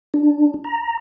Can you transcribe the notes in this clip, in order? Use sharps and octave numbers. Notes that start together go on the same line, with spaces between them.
D4
A#5